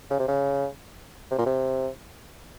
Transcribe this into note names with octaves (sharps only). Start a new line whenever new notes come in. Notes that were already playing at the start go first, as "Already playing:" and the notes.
C#3
C3
C#3
C3
A#2
C3